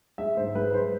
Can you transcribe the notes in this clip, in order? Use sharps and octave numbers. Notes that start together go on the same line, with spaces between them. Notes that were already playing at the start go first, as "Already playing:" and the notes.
G#3 E5
G#2 C5
G#3 B4
G#3 C5